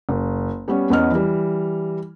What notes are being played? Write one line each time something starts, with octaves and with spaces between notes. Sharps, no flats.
F#1
G3 B3 C#4 C#5
E2 B3 C#4 D#5 F6
E3 G3